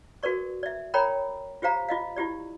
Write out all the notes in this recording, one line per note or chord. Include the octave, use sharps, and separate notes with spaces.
F#4 A#4 B4 D5 C#6
D5 E5
A#4 C#5 D5 G5 A#5 B5
F4 G4 C5 F5 A#5
F4 D#5 F5
E4 F4 G4 D5